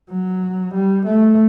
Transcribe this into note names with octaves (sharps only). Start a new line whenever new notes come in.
F#3
G3
A3